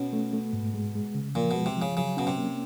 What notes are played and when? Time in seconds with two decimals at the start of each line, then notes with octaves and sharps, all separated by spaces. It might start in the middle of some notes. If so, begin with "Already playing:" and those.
Already playing: B2 C#4
0.13 A3
0.33 A3
0.53 G#2
0.74 G#3
0.95 G#3
1.15 C#3
1.35 A#2 F3
1.51 B2 G#3
1.66 C3
1.76 F3
1.82 C#3
1.97 C#3 F#3
2.17 B2 C#4
2.27 C3
2.37 A#3